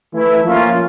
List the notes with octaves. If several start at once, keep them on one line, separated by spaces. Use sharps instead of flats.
E3 A3 E4
F3 A#3 C#4 F4